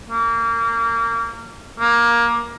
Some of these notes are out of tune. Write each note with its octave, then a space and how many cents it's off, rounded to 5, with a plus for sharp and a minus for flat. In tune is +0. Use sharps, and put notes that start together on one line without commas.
A#3 -25
A#3 +15